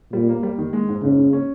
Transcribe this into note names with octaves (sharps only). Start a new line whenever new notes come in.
A#2 G3
A#3
G3
D#3
G#3
G#2
G#2 C#3
G#2
C#4